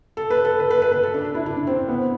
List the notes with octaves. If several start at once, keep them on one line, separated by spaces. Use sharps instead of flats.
A4
B4
A4
B4
B4
B4
B4
A4
D4
D4
E4
D4
D4
C4
C4
B3